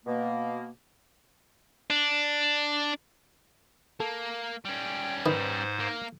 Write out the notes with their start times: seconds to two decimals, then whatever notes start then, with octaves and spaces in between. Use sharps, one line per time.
0.06 B2 A#3
1.90 D4
4.00 A#3 A4
4.65 G3 C#4 G5
5.26 G#2 D#3 B4 C5
5.80 A#3